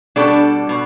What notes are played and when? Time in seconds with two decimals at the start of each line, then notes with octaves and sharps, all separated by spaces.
0.16 B2 G3 D4 A4 D5
0.69 B2